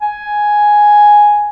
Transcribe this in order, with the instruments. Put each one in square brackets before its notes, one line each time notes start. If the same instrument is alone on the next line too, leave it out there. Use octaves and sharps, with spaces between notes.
[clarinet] G#5